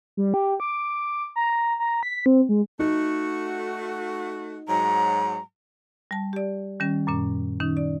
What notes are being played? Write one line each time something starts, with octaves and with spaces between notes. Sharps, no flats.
G3
G4
D6
A#5
A#5
B6
C4
G#3
A3 D#4 F#4
G#2 F#3 A#5
G3 A5
G4 D5
D#3 G3 C#4
F#2 A#2 C#4
D#3 C#4 D#4
D5